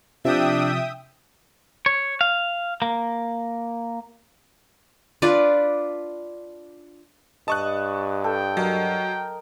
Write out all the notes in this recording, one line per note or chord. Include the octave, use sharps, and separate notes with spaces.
C3 F3 D4 E5 G5 D#6
C#5
F5
A#3
D4 F4 B4 D5
G2 D#5 A5 C#6 F#6
A4 G5
F#3 A#4 D#5